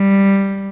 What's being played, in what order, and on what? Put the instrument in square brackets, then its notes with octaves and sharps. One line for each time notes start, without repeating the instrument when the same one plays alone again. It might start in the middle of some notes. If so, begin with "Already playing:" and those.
Already playing: [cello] G3